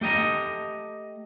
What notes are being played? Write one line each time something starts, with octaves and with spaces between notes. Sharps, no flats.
A3 G4 D#5 A#5